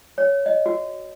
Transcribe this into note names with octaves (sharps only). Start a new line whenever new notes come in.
C#5
D#5
F#4